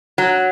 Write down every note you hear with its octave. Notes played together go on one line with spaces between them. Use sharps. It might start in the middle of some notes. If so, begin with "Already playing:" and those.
F#3